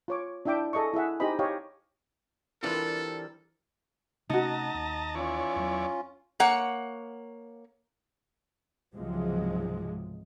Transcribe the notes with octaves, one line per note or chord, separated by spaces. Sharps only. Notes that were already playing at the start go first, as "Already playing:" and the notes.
F4 C#5 D6
D4 E4 E5 G5 D6
G#4 A4 D#5 E5 C#6
E4 G#4 E5 F#5
D#4 G4 G#4 C5 D#5 B5
G4 C#5 D#5 F5 G5
C3 E3 G3 D4 F4 A4 A#4
C3 A3 C#4 D#4 F#4 D#5 A5 A#5
D#2
E3 C#4 F4 C#5 D5
E2 F#3
A#3 C#5 F#5
C#2 G#2 C3 F3 F#3 G#3